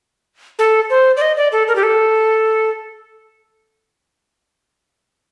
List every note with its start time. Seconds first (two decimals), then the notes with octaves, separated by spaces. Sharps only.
0.59 A4
0.90 C5
1.17 D5
1.22 D#5
1.37 D5
1.52 A4
1.68 A#4
1.76 G4
1.83 A4